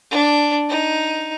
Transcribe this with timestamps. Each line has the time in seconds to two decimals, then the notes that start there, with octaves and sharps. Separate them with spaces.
0.11 D4
0.69 D#4